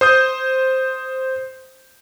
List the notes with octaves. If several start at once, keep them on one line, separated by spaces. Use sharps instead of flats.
C5 D#6 G6